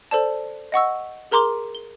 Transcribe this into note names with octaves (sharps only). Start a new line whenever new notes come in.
A4 C5 D5 A5
D#5 F#5 C#6 E6
G#4 A#4 A#5 C6 D6 G7
G7